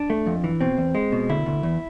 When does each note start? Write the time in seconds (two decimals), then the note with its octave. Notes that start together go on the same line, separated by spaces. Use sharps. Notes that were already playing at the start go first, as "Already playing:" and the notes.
Already playing: D4
0.10 A3
0.27 F2
0.44 E3
0.61 B2 C4
0.78 E2
0.95 G#3
1.12 B2
1.29 D2 E4
1.46 D2
1.63 E2